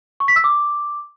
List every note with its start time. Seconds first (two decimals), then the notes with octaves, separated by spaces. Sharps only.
0.20 C#6
0.28 B6
0.36 E6
0.44 D6